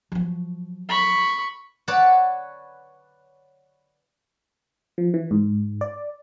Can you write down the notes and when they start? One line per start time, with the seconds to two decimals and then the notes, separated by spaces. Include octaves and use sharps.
0.12 F3 F#3
0.89 B5 C#6
1.88 B4 C#5 D5 F#5 A5 B5
4.98 F3
5.14 E3
5.31 G#2
5.81 D5